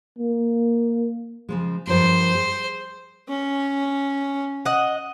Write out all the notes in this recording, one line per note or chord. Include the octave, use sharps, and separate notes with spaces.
A#3
C#3 F3 G#3
G2 F3 A#4 C5
G#4
C#4
D#5 F#5